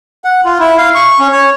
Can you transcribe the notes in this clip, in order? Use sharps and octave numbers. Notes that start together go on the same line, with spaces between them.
F#5
F4
E4
F5
C#6
C#4
C#5